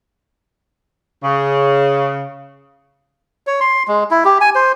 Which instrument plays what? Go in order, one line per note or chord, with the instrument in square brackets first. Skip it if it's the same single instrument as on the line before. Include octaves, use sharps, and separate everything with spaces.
[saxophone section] C#3
[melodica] C#5
C6
G#3
E4
G4
G#5
C5